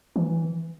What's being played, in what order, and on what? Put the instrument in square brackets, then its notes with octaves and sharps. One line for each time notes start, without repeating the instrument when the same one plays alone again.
[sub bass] E3